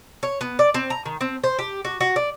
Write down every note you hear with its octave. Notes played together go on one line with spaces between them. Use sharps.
C#5
B3
D5
C4
A#5
D#3
C4
C5
G4
F#4
F#4
D5